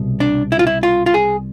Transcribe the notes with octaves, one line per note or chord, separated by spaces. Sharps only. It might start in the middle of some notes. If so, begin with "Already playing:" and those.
Already playing: C2 B2
D4
E4
F4
E4
F4
F4
G#4